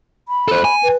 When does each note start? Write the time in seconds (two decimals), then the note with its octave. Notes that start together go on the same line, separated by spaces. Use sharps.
0.28 B5
0.48 A4 C5
0.65 G#5
0.83 B4